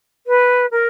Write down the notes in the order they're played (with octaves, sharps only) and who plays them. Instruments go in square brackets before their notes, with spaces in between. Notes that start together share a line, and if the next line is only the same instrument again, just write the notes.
[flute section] B4
A#4